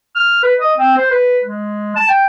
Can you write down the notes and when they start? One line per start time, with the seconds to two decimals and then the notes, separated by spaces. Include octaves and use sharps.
0.15 F6
0.43 B4
0.60 D#5
0.78 C4
0.97 C5
1.11 B4
1.44 G#3
1.96 A5
2.08 G5